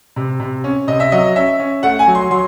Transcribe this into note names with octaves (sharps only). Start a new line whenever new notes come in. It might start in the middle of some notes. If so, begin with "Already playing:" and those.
C3
C3
C#4
C3 D#5
E5
F#3 D#5
C#4 E5
C#4
A3 F#5
G#5
F#3
C6
F#3 C6